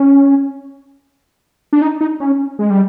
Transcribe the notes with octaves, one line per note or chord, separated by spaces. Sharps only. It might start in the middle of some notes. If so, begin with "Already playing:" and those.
Already playing: C#4
D4
D#4
D#4
C#4
G#3
G3